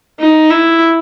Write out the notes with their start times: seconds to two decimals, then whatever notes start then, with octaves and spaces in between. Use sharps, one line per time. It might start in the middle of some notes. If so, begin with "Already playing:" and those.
0.20 D#4
0.50 E4